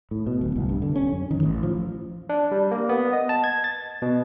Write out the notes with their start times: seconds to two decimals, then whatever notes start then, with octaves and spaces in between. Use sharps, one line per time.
0.11 A2
0.27 B2
0.41 D1
0.56 C2
0.69 G2
0.82 D3
0.96 C#4
1.12 F#2
1.31 D#3
1.43 A1
1.63 F3
2.29 D4
2.51 G3
2.71 A#3
2.89 B3
3.13 D#5
3.29 A5
3.44 G#6
3.64 A6
4.02 B2